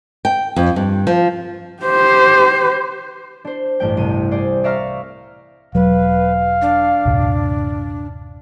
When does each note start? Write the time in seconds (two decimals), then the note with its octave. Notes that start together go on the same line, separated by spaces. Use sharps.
0.25 G5
0.56 F2
0.76 G2
1.07 F3
1.83 G4 C5
3.45 D4 C5
3.80 A1 G2 A3 G5
3.97 C2 D#7
4.31 G#4 C5 D5
4.64 D5 E5 F5 A#5 C#6 F6
5.75 E1 F#3 G#3 B4 F5
6.62 D4
7.05 D#1 C2 G2